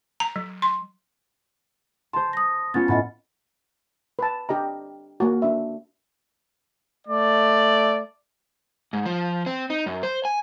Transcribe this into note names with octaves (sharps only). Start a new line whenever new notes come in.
A#5
F#3
C6
C5 A5 C6
D#6 A#6
B3 C#4 F4 A6
A2 D#5 F#5 B5 A6
B4 A5
D4 G4 D#5 A#5
A#3 F#4
D4 E5
A3 D5
G#2
F3
C4
D#4
F#2
C5
G#5